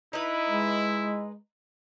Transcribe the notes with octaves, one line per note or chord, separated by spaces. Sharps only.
D#4 E4 B4
G#3